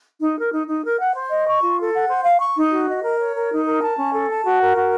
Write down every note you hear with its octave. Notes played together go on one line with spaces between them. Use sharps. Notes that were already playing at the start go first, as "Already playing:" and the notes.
D#4
A#4
D#4
D#4
A#4
F#5
C5
D#5
C#6
F4
A4
F#5
C5
F5
C#6
D#4
F#4
D#5
A#4
C#5
A#4
D#4
A#4
A5
C#4
A4
A5
F#4
A#4
F#4